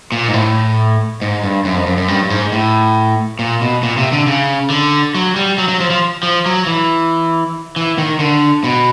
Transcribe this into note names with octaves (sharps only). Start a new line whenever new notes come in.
A#2
G#2
A2
G#2
G2
F#2
F2
F#2
F#2
G2
G2
G#2
A2
A#2
B2
A#2
C3
D3
C#3
D3
F#3
G3
F#3
F#3
F3
F3
F3
F#3
E3
E3
D#3
D3
B2